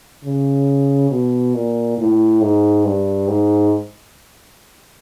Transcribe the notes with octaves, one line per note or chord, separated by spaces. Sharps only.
C#3
B2
A#2
A2
G#2
G2
G#2